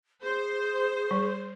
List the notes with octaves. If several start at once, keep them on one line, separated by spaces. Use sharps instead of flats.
G#4 C5
G3